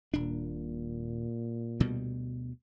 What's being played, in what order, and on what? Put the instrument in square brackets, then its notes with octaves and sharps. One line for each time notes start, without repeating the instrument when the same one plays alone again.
[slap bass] D#1 D4 [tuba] A#2
[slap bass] D2 B2 G3